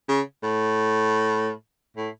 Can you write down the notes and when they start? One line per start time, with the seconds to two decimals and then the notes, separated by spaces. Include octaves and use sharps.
0.09 C#3
0.43 A2
1.97 A2